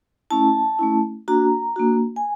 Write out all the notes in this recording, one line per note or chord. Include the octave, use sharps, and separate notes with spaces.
A3 C#4 E4 A5
A3 C#4 E4
A#3 D4 F#4 A#5
A#3 D4 F#4
G#5